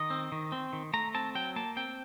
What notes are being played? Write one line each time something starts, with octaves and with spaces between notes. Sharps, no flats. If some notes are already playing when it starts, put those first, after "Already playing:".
Already playing: D#3 D#5
C4
D#3
C4
D#3
A3 A#5
C4 A5
F#3 G5
A#3 A5
C4 G5